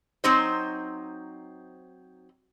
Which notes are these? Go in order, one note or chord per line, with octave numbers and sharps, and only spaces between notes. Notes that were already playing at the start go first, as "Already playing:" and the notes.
F#3 C4 D#4 C5